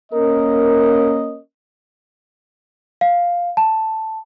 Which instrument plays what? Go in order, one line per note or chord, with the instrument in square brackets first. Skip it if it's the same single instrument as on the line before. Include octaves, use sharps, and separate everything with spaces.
[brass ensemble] A#3 C#4 A#4 D#5
[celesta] F5
A5